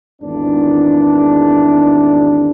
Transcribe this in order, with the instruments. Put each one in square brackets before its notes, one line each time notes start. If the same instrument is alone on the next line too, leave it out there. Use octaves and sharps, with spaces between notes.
[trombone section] G#1 E2 D4